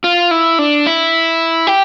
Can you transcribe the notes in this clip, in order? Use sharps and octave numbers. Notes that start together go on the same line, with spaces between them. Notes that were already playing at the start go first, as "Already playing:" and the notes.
F4
E4
D4
E4
G4